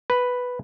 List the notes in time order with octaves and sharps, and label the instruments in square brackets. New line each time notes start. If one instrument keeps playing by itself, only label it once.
[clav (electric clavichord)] B4